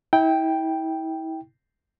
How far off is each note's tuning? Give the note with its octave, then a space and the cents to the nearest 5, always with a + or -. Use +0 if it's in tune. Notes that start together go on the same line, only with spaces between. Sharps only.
E4 -35 G5 +0